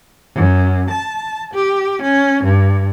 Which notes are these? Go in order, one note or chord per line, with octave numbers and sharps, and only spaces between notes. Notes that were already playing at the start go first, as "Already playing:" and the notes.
F#2
A5
G4
C#4
G2